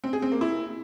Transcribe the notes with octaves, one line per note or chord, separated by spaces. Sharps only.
C4
G#4
C4
A#3
E4